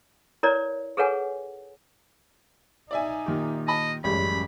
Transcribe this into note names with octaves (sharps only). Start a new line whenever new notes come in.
E4 A#4 B4 C#5 D5
G#4 A4 B4 C#5 F#5 G#5
D#4 D5 E5 G#5
A#2 D#3 G4
D#5 A5 B5
A1 F#2 G3 G#3 C#4 B5